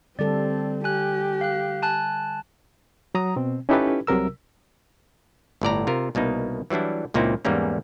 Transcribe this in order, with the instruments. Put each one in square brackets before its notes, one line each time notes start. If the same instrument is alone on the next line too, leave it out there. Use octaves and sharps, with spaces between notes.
[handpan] D3 G3 A4 [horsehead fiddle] C4 [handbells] D5
[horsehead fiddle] G4 [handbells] G#5 F#6
[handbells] F5 F#6
G#5 A5 F#6
[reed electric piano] F#3 A#5 D#6
B2 C4
C#4 D#4 E4 G4 A4 B4
C2 C3 F#3 A#4 E6
[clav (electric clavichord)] G1 A2 D5 A#5
C3 F4 A#4
C2 B2 A#3 D#4
E3 F#3 G3 D4 E4
C#2 A#2 A#3 C4 D#4 E4
E2 G#2 E3 G3 A#3 C#4